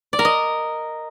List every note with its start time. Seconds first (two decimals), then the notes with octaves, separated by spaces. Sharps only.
0.13 D5
0.19 A#4
0.25 D#5